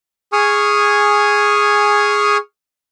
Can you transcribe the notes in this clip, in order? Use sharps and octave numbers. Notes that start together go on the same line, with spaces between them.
G#4 G#5 C#6 D#6 F6